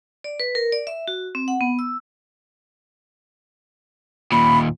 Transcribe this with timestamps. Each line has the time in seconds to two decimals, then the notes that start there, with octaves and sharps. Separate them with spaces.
0.24 D5
0.40 B4
0.55 A#4
0.72 D5
0.87 E5
1.08 F#4
1.35 C4
1.48 F#5
1.61 B3
1.79 E6
4.32 D#2 A#2 B5